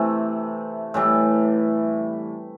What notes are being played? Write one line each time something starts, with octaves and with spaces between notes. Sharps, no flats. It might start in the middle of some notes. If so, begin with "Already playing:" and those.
Already playing: C3 E3 A3
A2 E3 G3